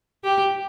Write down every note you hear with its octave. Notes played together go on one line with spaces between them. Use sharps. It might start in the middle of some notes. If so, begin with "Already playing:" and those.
G4